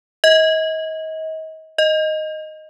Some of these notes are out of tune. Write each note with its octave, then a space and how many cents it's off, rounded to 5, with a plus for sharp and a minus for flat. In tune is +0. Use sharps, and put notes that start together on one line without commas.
D#5 +35
D#5 +0